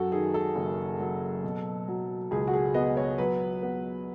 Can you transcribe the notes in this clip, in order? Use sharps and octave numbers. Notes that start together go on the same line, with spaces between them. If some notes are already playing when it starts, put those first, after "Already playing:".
Already playing: F#2 F#4 A4
D#3 G#4
A4
F#1
F#3
B2
F#3
C#2 G#4
F#4
G#4
B3 D#5
C#5
F#3 B4
B3